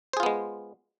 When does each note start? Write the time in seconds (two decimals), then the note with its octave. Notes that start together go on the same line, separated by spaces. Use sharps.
0.13 C5
0.17 G#4
0.20 F4
0.23 B3
0.26 G#3